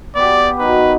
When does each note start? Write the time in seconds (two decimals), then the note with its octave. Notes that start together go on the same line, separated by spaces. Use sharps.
0.15 B3 G4 D5
0.60 D#3 F#3 B4